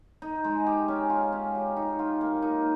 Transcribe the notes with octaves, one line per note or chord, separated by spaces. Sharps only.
D#4
G#3
G4
C#4
F4
C#4
G4
D#4
F4
A#3
D#4